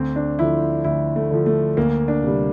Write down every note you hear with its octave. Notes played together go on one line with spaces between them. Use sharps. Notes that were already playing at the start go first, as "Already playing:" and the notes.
Already playing: D2 C4
D4
D3 F3 E4
D2 E4
A3
D3 F3
A3
D2 A#3
D4
C3 G3